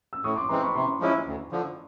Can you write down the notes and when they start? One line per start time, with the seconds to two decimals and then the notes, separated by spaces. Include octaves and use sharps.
0.13 E6
0.24 A2 C#6 D#6
0.36 C6 D6
0.49 E3 G#3 C4 A#5 C6
0.62 B5 C#6
0.74 C3 A#5 C6
1.00 F3 G#3 C#4 E4
1.26 D2
1.51 D3 F3